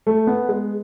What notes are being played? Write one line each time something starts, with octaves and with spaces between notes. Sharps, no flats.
A3
B3
G#3